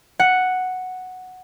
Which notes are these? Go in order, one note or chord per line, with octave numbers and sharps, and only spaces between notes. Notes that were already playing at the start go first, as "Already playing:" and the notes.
F#5